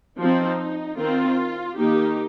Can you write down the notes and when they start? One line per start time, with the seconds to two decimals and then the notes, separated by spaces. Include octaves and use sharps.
0.19 F3 C4 D#4
0.98 D#3 C4 F4
1.77 D#3 A#3 D#4 G4